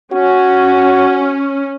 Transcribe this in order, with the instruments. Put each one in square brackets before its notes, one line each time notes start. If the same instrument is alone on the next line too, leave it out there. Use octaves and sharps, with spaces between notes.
[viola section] C#4 [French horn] F#4